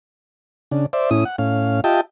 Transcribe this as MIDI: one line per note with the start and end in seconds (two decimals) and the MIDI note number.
0.71 0.86 49
0.71 0.86 62
0.93 1.10 72
0.93 1.10 74
0.93 1.10 76
1.11 1.24 45
1.11 1.24 61
1.11 1.24 64
1.11 1.24 87
1.25 1.36 78
1.38 1.81 45
1.38 1.81 61
1.38 1.81 77
1.84 2.01 65
1.84 2.01 67
1.84 2.01 75
1.84 2.01 76
1.84 2.01 79
1.84 2.01 81